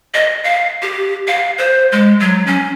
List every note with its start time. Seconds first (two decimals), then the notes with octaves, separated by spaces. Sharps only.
0.14 D#5
0.44 F5
0.82 G4
1.27 F5
1.58 C5
1.92 G#3
2.20 F#3
2.47 C#4